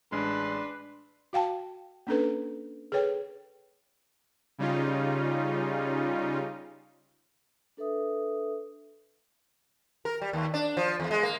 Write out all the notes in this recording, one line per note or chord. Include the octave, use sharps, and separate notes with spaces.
A1 G#3 D4 B4 C6
F#4 F5 G5 A5
A#3 C#4 D4 A4 B4
G#4 A4 B4 C#5 G5
C#3 G3 C#4 D#4 F4
D4 A4 B4 E5 D#6
A#4
G3
D#2
D4
F3
E2
G#3
A#3